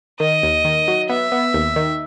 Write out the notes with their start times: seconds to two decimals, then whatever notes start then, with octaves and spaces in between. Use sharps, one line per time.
0.20 D#3 D#5
0.43 D#2
0.65 D#3
0.88 F#3
1.09 B3 E5
1.32 B3
1.54 D#2
1.76 D#3